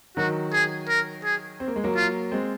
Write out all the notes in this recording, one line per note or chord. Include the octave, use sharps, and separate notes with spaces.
D#3 F#3 F#4
G#4
A#4
G#4
C4
A#3
G#3
F#3 A#3
F4
G#3 C4